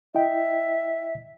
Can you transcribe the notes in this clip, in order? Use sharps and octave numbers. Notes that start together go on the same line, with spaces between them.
E4 D#5 E5 G5